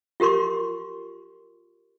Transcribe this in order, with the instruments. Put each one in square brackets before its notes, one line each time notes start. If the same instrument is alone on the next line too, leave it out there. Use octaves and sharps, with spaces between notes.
[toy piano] F4 G4 A#4 C6 C#6